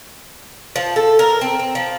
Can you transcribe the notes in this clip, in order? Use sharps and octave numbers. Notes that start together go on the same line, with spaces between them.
F3
A4
A#4
C4
C4
F3